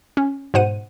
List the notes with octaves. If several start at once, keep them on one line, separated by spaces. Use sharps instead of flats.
C#4
G#2 B2 C5 F#5 D#7